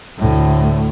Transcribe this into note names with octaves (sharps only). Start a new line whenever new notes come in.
D2 A2